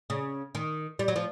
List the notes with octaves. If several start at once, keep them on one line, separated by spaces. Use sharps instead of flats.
C#3
D#3
G3
F#3
F3